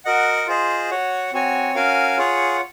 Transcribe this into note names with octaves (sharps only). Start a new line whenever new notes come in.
F#4 A#4 D#5 F#5
F4 G#4 C5 D#5
F#4 C#5 F#5
C4 F#4 C#5 G#5
C#4 F#4 A#4 F5 G#5
F4 G#4 C#5 F#5